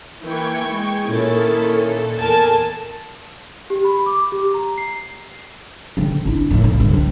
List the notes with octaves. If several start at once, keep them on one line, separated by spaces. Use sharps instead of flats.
E3 A#3 G5 C#6 G#6
G#3
A#2 D#3 C#4 E4 A4 A6
E2 A4 A#4 G#5 A5
G4
B5
D6
G4
A#5
C7
D3 C4
D4 E4
A2 D#3
B1
G2 D3
C4